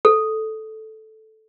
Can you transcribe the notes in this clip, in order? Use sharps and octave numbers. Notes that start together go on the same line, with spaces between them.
A4